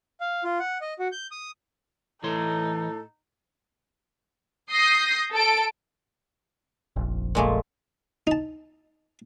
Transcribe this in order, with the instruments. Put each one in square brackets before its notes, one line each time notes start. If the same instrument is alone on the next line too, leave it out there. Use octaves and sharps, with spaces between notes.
[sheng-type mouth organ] F5
F4
F#5
D#5
F#4
G6
D#6
[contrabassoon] A2 [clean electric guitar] E3 C#5 C6 [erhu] D#4 [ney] A4
[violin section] D#6 G6 A#6 C7
A4 D7
[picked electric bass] F1 A#1 F2
[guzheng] A#2 G#3 A3
[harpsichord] D#4 A5